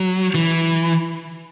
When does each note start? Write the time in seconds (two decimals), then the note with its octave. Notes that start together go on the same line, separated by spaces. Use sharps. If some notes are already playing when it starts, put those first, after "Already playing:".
Already playing: F#3
0.35 E3